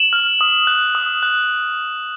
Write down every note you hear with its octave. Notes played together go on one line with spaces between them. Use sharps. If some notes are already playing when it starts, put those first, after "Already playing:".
Already playing: E7 F#7
F6
D#6
F#6
D#6
F#6